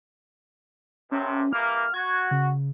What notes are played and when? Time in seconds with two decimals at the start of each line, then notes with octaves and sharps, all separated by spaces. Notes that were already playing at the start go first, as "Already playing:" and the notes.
1.12 A#1 G2 C3 C#4
1.53 E3 G3 A#3 F6
1.94 F#4 G#6
2.31 C#3